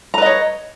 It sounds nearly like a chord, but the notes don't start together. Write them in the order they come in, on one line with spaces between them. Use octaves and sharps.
A#5 B4 D#5 C#5